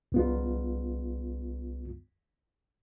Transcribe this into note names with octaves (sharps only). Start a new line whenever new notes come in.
C2 B3 F4